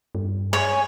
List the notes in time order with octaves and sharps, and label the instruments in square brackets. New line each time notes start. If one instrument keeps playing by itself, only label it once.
[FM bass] G2
[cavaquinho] C#5 [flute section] G#5